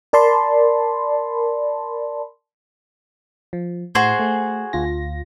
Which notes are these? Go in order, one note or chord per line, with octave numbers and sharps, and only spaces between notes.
A#4 D5 A5 B5 C6
F3
A2 F#4 G#4 C5
A3
D2 F4 A#6